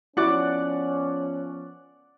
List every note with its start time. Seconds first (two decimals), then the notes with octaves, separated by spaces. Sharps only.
0.17 F3 B3 C#4 E4 F#4 D5 F#5 D6